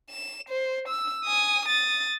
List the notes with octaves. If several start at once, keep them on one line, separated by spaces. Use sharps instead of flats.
E7
C5
E6
G#5 D#6
D#6 A6